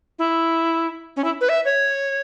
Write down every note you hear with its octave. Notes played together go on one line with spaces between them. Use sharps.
E4
C#4
E4
B4
E5
C#5